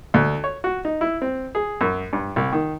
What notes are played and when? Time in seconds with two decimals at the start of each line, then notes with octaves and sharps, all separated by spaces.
0.14 D2
0.44 C#5
0.64 F#4
0.85 D#4
1.01 E4
1.22 C4
1.55 G#4
1.81 F#2
2.13 G2
2.36 C2
2.52 D#3